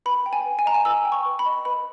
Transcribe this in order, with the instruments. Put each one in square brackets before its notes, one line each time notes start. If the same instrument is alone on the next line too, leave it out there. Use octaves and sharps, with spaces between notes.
[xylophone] B4 B5
G5
G#5
B4
G#5
D#5 A#5
G#5
B4 E6
G5
C#6
B4
B5
D#5
B4 B5